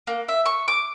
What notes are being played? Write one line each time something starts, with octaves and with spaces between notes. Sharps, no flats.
A#3
E5
C#6
D6